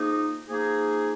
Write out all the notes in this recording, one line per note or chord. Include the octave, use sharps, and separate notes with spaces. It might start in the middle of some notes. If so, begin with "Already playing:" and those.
Already playing: F3 A#3 D#4 G#4
F3 A#3 D#4 G#4